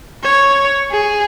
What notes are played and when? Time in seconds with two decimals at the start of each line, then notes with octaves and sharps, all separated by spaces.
0.23 C#5
0.91 G#4